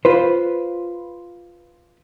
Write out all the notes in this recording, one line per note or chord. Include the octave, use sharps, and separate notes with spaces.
F4 B4 C5